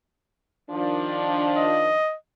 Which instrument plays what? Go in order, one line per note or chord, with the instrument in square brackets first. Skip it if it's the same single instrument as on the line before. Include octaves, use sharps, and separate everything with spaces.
[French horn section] D#3 F3 D4
[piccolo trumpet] D#5